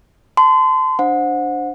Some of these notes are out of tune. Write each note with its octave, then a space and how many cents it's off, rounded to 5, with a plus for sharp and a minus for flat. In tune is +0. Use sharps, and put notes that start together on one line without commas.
A5 +0 C6 -30
D4 +0 C5 +0 F#5 -30